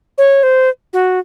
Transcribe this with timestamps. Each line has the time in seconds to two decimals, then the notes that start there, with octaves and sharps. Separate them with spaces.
0.18 C#5
0.43 C5
0.93 F#4